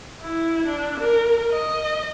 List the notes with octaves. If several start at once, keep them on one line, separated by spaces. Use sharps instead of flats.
E4
D4
A#4
D#5